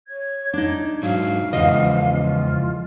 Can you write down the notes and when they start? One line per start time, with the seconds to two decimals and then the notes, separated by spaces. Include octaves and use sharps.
0.07 C#5 G#6
0.54 D4 D#4
1.03 G#2 F#3 F5
1.53 E2 C#3 F3 G#3 D#5
2.20 F4